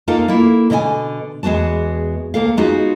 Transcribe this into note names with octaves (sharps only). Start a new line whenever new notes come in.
A#3 D#4 F4 A4 A#4 F5
A#3 E4
B2 D3 D#5 F5 G#5
E2 G#3 B3 F#4 A5
D2 A#3 A4 F5
G#3 B3 D#4 F4 F#4 G#4